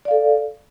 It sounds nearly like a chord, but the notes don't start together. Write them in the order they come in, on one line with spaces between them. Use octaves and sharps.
D5 F5 A4